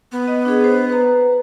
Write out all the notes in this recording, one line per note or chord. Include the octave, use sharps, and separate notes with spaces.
B3
D#5
D4 G#4
C5
B4 A#5